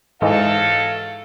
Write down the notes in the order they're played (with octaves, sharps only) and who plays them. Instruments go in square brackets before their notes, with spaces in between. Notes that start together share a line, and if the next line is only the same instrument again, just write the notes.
[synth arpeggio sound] G#2 E3 G#3 [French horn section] F#3 D#4 A4 [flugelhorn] F5